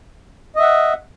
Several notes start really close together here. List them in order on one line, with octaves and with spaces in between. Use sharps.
D#5 E5 F#5